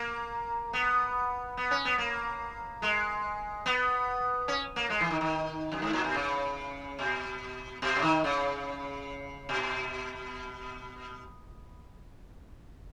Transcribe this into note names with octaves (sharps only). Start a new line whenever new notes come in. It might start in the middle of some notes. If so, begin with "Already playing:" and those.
Already playing: A#3
B3
B3
C#4
B3
A#3
G#3
B3
C#4
A#3
G#3
E3
D#3
D#3
F#2
G#2
A#2
B2
C#3
B2
B2
C#3
D#3
C#3
B2